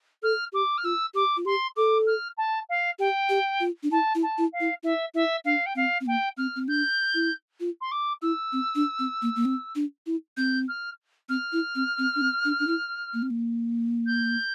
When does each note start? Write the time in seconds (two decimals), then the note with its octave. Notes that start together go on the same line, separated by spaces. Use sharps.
0.23 A4 F6
0.53 G4 D6
0.77 F6
0.84 F4 E6
1.14 G4 D6
1.37 F4
1.45 G4 C6
1.76 A4 D6
2.06 F6
2.37 A5
2.69 F5
2.99 G4 G5
3.29 G4
3.60 F4
3.83 D4
3.91 E4 A5
4.15 E4
4.22 A5
4.38 E4
4.52 F5
4.60 E4
4.83 E4 E5
5.14 E4 E5
5.45 D4 F5
5.66 G5
5.75 C4 F5
6.01 C4
6.06 A#3 G5
6.37 C4 F6
6.56 C4
6.68 D4 G6
7.14 E4
7.60 F4
7.81 C6
7.91 D6
8.22 E4 E6
8.53 C4
8.75 D4
8.99 C4
9.22 A#3
9.36 A#3
9.45 C4
9.75 D4
10.06 E4
10.36 C4 G6
10.68 F6
11.29 C4 F6
11.53 E4
11.75 C4
11.99 C4
12.16 D4
12.21 C4
12.45 D4
12.60 D4
12.67 E4
13.14 A#3
13.22 C4
13.30 A#3
14.06 G6